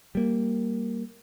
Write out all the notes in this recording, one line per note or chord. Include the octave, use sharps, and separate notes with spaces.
G3 A#3